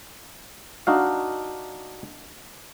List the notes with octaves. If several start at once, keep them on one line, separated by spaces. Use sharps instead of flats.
D4 D#4 F#4 F5